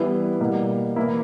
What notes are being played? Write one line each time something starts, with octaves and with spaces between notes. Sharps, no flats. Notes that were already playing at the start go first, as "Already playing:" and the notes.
Already playing: E3 G3 B3 E4
B2 G3 A#3
E3 A#3 E4